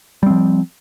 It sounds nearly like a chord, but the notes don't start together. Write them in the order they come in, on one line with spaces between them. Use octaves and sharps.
G3 C4 F3